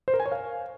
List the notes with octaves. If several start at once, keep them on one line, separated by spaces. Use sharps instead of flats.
C5
A#4
G#5
C#5
F5